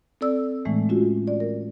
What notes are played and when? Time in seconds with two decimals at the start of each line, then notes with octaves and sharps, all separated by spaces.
0.21 C4 A4 D5 E6
0.65 A2 E3 G#3 A3
0.89 C#4 F4 F#4
1.28 D5
1.40 A#4